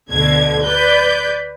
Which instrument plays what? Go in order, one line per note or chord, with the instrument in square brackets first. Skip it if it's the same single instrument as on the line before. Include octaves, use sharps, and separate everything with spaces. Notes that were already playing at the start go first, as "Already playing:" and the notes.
[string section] D2 B2 D3 G#6
B4 D5 G6